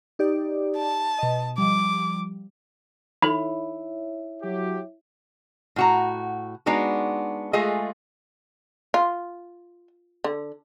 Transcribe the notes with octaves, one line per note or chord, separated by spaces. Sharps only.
D#4 G4 D5
A5
B2 D#5
F3 G3 D6
D#4 E4 A4 C#5 E5 B5
F#3 G4
A2 F#4 A#5
G#3 B3 D4 D#4 F#4
G#3 A3 F4 G#4 D#5
F4
D3